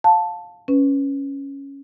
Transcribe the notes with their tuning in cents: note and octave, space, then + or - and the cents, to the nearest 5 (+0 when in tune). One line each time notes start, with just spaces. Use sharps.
F5 +20 A5 +0
C#4 +0 B4 +0